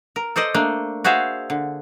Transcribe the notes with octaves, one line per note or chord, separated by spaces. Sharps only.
A#4
A4 C5 D5 D#5
A3 A#3 D4
F#4 G#4 C5 E5 F5
D3